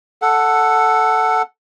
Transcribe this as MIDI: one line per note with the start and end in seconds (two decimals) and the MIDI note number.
0.22 1.42 69
0.22 1.42 78